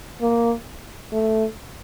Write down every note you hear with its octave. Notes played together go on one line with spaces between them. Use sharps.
A#3
A3